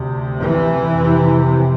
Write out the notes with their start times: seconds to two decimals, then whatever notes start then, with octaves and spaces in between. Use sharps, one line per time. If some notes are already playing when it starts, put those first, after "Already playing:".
Already playing: D2 C3
0.39 E3
0.93 F2 C3